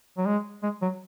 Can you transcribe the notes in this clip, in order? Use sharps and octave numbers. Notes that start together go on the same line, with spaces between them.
F#3
G#3
G#3
F#3